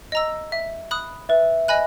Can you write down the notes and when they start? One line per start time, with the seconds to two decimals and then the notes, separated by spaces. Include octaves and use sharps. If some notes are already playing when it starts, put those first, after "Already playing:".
0.12 D#5 A#5 E6
0.52 E5
0.91 B5 D#6 F#6
1.29 B4 E5
1.68 D#5 G#5 B5 F#6